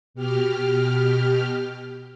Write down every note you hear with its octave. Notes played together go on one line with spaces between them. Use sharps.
B2 G4 F6